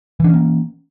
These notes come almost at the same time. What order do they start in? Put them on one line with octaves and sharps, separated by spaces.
E3 D4 C#4 A#3